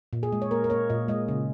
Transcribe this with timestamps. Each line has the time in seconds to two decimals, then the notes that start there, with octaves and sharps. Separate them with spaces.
0.13 A#2
0.23 G#4
0.32 G#3
0.42 C#5
0.51 A#3 A#4
0.64 A#4
0.70 A#3 C#5
0.90 A#2 D#5
1.08 G#3 D#5
1.28 C#3